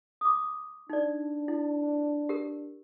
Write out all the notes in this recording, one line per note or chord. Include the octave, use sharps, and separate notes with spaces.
D6 D#6
D4 D#4 D5
E4
G4 A#4